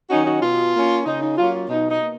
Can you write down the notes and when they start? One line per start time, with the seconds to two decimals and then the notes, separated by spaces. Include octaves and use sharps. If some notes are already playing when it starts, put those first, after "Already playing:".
0.10 D#3 F#3 C#4 D#4 F#4
0.25 D#4 F#4
0.41 B2 F4
0.74 A#3 C#4
1.05 C#3 D#4
1.22 D#4
1.37 F#3 A#3 C#4 F4
1.53 F4
1.69 B2 D#4
1.90 D#4
2.01 A#3